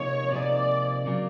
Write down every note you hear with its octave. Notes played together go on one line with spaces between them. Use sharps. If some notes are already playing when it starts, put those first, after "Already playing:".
Already playing: C3 F3 A#3 D#4 G#4 C#5
C3 F3 A#3 D#4 G#4 D5
C#3 F#3 A#3 C#4